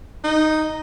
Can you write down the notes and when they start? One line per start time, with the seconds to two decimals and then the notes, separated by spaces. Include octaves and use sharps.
0.24 D#4